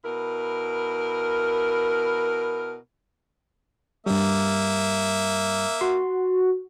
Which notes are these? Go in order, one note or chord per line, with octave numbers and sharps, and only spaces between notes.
B2 E4 A#4
G2 G3 A#3 E5
F#4 C6